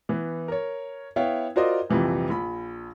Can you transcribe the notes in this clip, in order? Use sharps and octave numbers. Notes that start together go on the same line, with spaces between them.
E3 B3
A#4 C#5
B3 E4 C#5 F5 G5
F4 F#4 A#4 C5 D5 D#5
A#1 F2 C3 E3 G3
A#1 B5